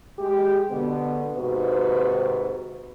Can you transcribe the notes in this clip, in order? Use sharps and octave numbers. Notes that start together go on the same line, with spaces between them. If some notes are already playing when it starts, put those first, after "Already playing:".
G#3 G4
B2 D3 B3
D#2 G#2 C3 F#4 B4 C5